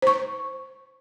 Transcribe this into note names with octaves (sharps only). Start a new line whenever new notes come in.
C5 C#6